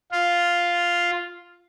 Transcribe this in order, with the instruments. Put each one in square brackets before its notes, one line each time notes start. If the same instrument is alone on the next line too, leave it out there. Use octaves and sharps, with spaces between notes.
[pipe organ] F4